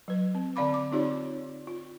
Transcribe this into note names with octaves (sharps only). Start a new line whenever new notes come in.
F#3 B4
C4
D3 C4 D5 F5 B5 D6
D6
C4 D#4 F4 G4 C#5 D5
F4